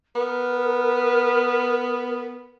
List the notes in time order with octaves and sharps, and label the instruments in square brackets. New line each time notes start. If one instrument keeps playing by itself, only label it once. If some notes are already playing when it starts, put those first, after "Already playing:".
[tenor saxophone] B3 [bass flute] A#4